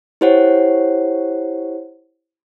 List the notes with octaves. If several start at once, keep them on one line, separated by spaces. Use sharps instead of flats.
E4 G4 C5 C#5 F#5